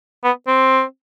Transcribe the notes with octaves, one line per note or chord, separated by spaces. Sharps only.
B3
C4